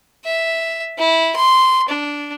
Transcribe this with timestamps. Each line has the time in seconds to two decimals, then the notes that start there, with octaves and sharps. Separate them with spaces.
0.25 E5
0.99 E4
1.36 C6
1.89 D4